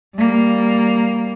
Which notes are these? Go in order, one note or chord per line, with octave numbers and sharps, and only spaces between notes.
G3 A#3